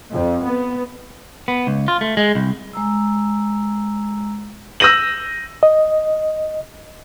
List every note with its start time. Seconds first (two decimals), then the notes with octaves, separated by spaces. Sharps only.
0.11 F2
0.43 B3
1.48 B3
1.67 C#2
1.88 F4
2.01 A3
2.17 G#3
2.35 C2
2.73 G#3 A#5 E6
4.80 E6 G6 A#6 D#7 F#7
5.63 D#5